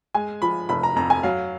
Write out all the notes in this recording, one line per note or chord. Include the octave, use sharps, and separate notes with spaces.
G#3 G#5
F3 B5
F1 B5
A#5
F2 A#5
G#5
F#3 F5